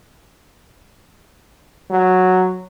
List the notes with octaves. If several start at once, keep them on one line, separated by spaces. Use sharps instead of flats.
F#3